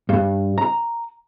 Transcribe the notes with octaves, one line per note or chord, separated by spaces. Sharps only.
G2
A#5